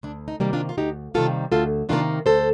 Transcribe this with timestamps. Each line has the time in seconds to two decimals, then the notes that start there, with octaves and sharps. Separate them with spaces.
0.03 D2 D4
0.28 D#4
0.40 C3 D#3 G3 A#3
0.53 D4 F4
0.69 F4
0.78 D2 D#4 G4
1.14 C3 D#3 G3 A#3 F4 A4
1.52 D2 F4 A4
1.89 C3 D#3 G3 A#3 D4 F4
2.26 D2 A4 C5